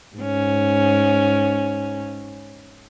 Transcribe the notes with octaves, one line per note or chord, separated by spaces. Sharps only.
G#2 C#4